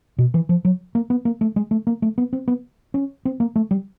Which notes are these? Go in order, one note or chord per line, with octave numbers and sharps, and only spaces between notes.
B2
E3
F3
F#3
A#3
B3
A#3
A3
G#3
A3
A#3
A3
B3
C4
B3
C#4
C4
A#3
A3
G3